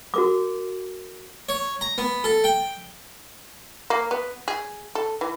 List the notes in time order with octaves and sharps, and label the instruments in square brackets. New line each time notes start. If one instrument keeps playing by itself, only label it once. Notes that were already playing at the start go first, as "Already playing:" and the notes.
[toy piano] F#4 A#4 D6
[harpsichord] C#5
A#5
B3
A4
G5
[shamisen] A#3
B3
G#4
A4
E3